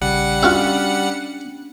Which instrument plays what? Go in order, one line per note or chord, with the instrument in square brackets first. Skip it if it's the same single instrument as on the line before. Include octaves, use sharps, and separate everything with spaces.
[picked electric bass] A#1 C#3 [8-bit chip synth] G3 F#5 C#7
[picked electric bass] C#4 D4 [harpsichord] F4 F#4 E5